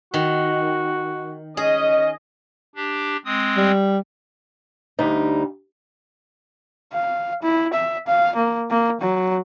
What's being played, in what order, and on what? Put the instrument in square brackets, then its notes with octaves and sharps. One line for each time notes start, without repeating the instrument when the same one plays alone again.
[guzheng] D#3 [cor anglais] F#4
[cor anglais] C#4 [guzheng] G#4 [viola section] D#5
[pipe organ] D4 G4
G#3 C4 D#6
[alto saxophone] G3
[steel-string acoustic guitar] D2 G3 D#4
[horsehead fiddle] F5
E4
E5
F5
A#3
A#3
F#3